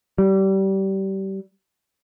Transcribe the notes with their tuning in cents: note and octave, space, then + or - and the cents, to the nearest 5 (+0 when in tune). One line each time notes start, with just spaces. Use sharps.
G3 -25